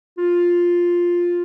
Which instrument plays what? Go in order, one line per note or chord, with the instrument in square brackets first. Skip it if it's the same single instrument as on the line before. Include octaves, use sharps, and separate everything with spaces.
[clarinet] F4